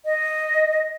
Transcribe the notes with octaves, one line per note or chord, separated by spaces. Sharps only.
D#5